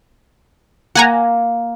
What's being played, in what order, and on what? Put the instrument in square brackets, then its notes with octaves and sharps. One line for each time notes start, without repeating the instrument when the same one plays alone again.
[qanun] A#3 [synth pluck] F#5 G#5 A#5